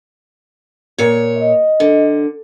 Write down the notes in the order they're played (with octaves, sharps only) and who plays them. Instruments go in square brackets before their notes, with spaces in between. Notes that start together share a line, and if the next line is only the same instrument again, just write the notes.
[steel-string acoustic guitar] A#2 C#5
[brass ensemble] D#5
[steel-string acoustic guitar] D3